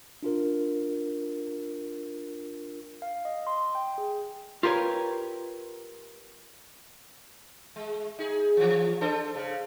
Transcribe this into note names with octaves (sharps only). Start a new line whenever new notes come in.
D4 F4 A#4
F5
D#5
C6
G5
G#4
F4 G4 A#4 B4 C#5
G#3
D#4 G#4
E3 F3
D4 A4 C5
C#3